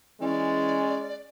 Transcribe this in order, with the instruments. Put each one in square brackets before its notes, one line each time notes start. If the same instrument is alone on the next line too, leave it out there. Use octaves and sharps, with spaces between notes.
[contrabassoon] E3 [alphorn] G#3 [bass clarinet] C#4 [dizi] D5